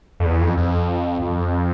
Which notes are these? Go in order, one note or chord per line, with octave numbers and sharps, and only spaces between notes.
F2
E2
F2
F2
F2